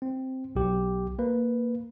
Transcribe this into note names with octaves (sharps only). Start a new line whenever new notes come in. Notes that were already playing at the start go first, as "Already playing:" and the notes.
C4
B1 G4
A#3 B4